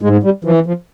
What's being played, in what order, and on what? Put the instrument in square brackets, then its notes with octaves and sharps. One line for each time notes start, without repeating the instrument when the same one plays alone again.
[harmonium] G#2 G#3
G3
E3 F3
F3